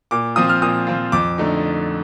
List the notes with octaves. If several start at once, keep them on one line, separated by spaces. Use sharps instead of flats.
A#2 D6
F3 C4 F4 D#6
F6
A#2 D#6
F3 C4 F4
F2 D6
D3 A3 D#4